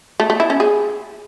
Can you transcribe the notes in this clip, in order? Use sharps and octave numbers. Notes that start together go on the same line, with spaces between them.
A3
A3
E4
C#4
G#4